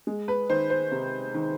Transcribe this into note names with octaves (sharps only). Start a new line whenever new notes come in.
G#3
B4
D#3 C5
C5
C3
D#3